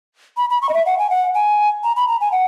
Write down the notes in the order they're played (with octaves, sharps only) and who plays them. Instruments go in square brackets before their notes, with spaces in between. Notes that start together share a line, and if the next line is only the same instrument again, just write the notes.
[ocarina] B5
B5
C#6
D#5
E5
F#5
G#5
F#5
G#5
A#5
B5
A#5
G#5
F#5